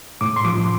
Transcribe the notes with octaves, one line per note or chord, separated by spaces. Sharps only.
A2 D6
C6
F3 D6